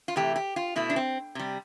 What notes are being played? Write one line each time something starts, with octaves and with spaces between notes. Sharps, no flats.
F4
C3 E3 A3 G4
G4
F4
B2 A3 E4
D4
C4
C3 G3